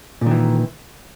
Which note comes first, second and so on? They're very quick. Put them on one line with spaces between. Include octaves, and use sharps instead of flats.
A#2 D#3 E3